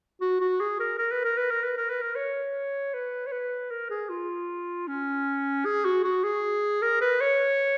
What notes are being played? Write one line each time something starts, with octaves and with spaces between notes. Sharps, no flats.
F#4
F#4
G#4
A#4
A#4
B4
A#4
B4
A#4
B4
A#4
B4
A#4
C#5
B4
C#5
B4
A#4
G#4
F4
C#4
G#4
F#4
F#4
G#4
A#4
B4
C#5